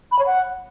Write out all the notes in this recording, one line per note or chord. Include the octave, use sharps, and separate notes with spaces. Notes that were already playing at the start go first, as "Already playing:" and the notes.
B5
C#5
F#5